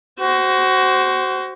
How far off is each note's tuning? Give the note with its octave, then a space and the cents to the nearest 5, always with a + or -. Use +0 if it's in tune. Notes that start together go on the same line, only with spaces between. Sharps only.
F#4 +25 C5 +0